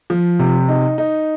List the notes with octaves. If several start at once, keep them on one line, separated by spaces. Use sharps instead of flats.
F3
C3
D#4
D#4